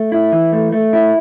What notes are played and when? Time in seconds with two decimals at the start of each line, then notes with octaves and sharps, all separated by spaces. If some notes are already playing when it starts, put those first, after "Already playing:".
Already playing: A3
0.12 E4
0.32 E3
0.53 A3
0.72 A3
0.93 E4